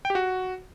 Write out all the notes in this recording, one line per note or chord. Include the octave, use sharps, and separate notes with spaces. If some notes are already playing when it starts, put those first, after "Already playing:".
G5
G4
F#4